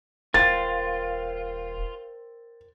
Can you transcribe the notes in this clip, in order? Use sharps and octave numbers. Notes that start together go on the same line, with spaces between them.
D#1 F4 A#4 C5 G5 A6